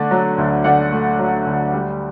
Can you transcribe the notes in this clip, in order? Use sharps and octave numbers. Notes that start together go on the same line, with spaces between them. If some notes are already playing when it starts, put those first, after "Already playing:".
Already playing: D3 A3 D5
F#3
D2
D3 D5 F#5
A3
F#3
D2
G3